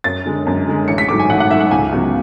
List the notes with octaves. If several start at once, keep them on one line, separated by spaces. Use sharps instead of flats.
F#2 A6
D3 G#3
F#2
D3 G#3
A1 C#7
B6
G#2 F#3 A3 D6
G#5
A1 F#5
F#5
G#2 F#3 A3 E5
F#5
C#2 G#5
C#3 F#3 B3